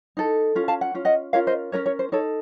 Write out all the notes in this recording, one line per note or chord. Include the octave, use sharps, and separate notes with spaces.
D#4 A4
C#4 F4
F5 A5
F#5
C#4 F4
D#5 F#5
C#4 F4 A#4 C#5 F5
C5 D#5
C#4 F4 A#4 C#5
C#5
C5
D#4 A4 C#5